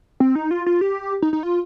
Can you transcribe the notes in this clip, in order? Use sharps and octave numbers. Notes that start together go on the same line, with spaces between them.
C4
D#4
F4
F4
G4
D#4
D#4
F4